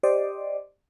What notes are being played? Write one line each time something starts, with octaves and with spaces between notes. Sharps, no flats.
G4 C5 D5 D#5